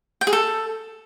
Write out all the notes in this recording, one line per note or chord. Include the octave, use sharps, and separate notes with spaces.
G5
G#4
A4